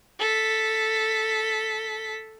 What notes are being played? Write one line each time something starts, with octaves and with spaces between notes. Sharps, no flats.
A4 B6